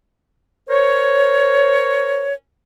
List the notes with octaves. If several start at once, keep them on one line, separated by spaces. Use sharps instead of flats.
A#4 C5 C#5